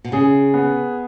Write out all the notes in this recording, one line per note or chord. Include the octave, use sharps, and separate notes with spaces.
B2
C#3 G#4
B3